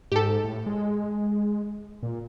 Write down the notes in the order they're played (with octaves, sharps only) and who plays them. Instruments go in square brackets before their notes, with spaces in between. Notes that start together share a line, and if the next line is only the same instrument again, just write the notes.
[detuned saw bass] G#2 [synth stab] G4 A4
[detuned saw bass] A2
G#3
A#2